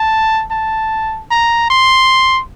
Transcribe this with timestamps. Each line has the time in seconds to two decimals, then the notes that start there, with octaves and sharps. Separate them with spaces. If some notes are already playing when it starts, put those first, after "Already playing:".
Already playing: A5
0.51 A5
1.31 A#5
1.70 C6